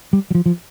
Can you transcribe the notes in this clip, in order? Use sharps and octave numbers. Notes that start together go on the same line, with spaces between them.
G3
F#3
F3
F3